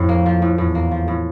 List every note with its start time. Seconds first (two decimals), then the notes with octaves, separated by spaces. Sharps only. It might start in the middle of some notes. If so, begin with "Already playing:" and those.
Already playing: F2 A2
0.09 A#3
0.26 F3
0.42 A2
0.58 E2 A2
0.75 A#3
0.92 F3
1.08 A2